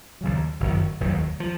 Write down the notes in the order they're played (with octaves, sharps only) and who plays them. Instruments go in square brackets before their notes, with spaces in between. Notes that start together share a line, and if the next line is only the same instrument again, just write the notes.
[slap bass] D#2 C#3 F#3
F#1 F#2 D#3 F#3
F1 D#2 D#3 F#3
F3